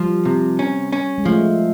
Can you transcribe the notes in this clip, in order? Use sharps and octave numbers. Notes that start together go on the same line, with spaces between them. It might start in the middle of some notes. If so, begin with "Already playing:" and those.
Already playing: F3 G3
C3
C#4
C#4
G#3
F3 A3